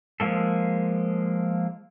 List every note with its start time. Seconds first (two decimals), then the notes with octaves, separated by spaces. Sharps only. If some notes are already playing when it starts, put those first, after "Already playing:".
0.20 F3 G#3 A#3 A4